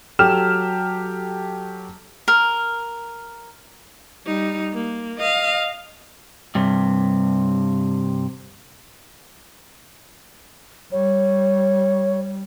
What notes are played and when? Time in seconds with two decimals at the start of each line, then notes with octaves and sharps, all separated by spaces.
0.19 F#3 G4 A4 F6 E7
2.28 A#4
4.26 G3 D#4
4.73 A#3
5.18 D#5 F5
6.55 G2 C3
10.92 G3 C#5